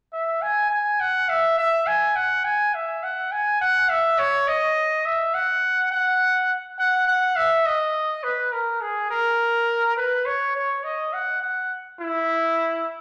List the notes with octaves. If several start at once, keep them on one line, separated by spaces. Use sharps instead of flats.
E5
G#5
G#5
F#5
E5
E5
G#5
F#5
G#5
E5
F#5
G#5
F#5
E5
C#5
D#5
E5
F#5
F#5
F#5
F#5
E5
D#5
B4
A#4
G#4
A#4
B4
C#5
C#5
D#5
F#5
F#5
E4